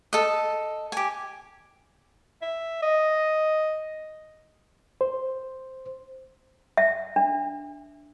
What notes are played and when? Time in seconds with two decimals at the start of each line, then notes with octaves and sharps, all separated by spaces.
0.13 A4 D#5
0.92 G4 G#5
2.42 E5
2.82 D#5
5.01 C5
6.77 E5
7.16 D4